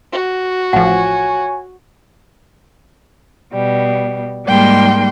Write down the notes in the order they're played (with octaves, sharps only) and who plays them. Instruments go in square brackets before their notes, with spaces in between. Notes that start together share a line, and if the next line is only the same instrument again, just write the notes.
[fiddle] F#4
[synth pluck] A1 F3 [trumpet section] C#5 G#5 [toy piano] F#5
[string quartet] B2 G3
G#2 G3 G#3 A#3 G5 C6